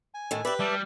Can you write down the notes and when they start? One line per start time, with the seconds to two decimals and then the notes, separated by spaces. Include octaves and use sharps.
0.14 G#5
0.31 A2 D#3 A3
0.45 G4 B4 D5 E5 B5
0.60 G3 D5 E5 A5